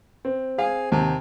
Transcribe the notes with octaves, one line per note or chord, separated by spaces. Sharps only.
C4
G#4 F5
D#2 C3